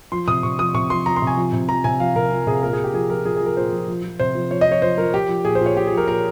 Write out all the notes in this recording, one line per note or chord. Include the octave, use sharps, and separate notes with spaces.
F3 C6
C3 D#6
C3 C#6
F3 D#6
C3 C#6
F3 C6
F3 A#5
C6
C3
G#5
F3
C3
F3 A#5
C3 G#5
F3 F5
C3 A#4
F3
C3 G#4
A#2 A#4
G#4
A#2
G4
F3 G#4
F3 A#4
F3 G#4
G#4
F3
A#4
A#2 C5
F3
F3
F3
C3 C5
F3
F3 C#5
D#5
F3
C#5
F3 C5
F3 A#4
F3 G4
F3
A#2 G#4
C5
A#2 C#5
A#2 G4
G#4
F3
A#4
A#2 A#4